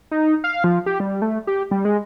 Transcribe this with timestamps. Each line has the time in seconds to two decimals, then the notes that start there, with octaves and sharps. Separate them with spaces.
0.11 D#4
0.44 F5
0.64 F3
0.86 G4
1.00 G3
1.22 A3
1.47 G4
1.71 G3
1.85 G#3